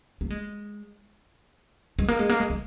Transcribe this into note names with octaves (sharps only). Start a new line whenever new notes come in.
A#3
G#3
G#3
A#3
G#3
A#3
G#3
A#3